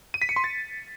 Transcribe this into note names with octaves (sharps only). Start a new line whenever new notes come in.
D#7
B6
C#7
C6
A6